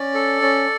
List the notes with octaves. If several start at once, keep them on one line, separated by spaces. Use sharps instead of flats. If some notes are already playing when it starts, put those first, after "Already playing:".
Already playing: C#4 D5
A4
C#4